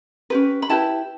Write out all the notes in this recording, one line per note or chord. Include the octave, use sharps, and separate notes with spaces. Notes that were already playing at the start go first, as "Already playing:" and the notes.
C#4 G4 B4
B5
E4 G4 B4 A5